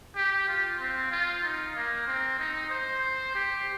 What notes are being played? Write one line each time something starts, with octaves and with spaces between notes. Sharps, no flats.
G4
F4
C4
F4
D#4
A#3
C4
D#4
C5
G4